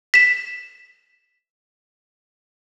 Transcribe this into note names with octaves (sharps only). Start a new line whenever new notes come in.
B6 E7